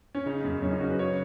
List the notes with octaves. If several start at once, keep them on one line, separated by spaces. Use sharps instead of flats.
C#4
C#3 D#4
F#2
F#2 C#4
D#4
C#3 F#4
B4
C#3 C#5